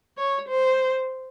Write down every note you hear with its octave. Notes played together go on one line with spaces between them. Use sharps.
C#5
C5